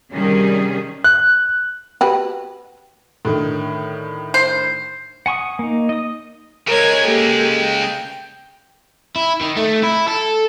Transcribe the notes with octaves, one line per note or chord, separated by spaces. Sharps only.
C3 D#3 G3 C#4 G#4
F#6
F#4 G4 B4
A2 D3 D#3
C5
F#5 G#5 C#6 D#6
A#3 D#4
D#5 D#6
C#3 G#3 A#4 C#5 G#6
A#3 G4 A4
G5
E4
D#3
A3
E4
A4